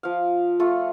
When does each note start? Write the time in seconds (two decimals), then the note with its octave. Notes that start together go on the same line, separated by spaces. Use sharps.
0.03 F3 F5
0.59 A3 F4 A4